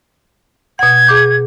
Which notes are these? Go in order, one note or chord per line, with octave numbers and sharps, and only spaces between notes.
B2 F#5 G#6
G#4 D6 G6